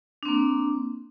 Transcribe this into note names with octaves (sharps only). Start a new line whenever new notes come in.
A#3 C4 D4